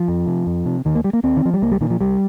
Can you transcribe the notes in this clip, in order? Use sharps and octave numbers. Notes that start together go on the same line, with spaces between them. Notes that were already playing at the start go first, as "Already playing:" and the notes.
Already playing: F3
F2
C3
F2
C3
D#2 D#3
A#3
G3
A#3
D#2 C4
D#3
F3
G3
C2 A#3
G3
A#2 D#3
F3
C2 G3